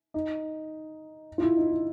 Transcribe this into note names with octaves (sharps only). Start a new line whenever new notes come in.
D#4
F4
E4
D#4
E4